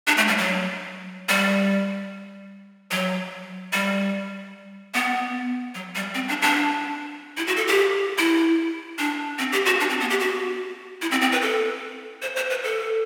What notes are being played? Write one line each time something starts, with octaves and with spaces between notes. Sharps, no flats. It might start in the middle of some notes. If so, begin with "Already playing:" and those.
D4
A3
G3
F#3
G3
F#3
G3
B3
F#3
G3
C4
D4
D4
E4
F#4
A4
G4
E4
D4
C4
G4
F#4
D4
C4
B3
G4
F#4
E4
C4
C4
B4
A4
C5
C5
B4
A4